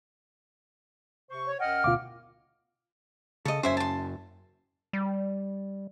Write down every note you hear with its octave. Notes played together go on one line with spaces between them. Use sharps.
C3 C5 C#6
C#5
F#2 D#5 F#5 G5 F6
D2 B2 F4 F5 D6
C#3 A4 D#5
F#1 F#2 C#4 C5 E5 G#5
A5 C6
G3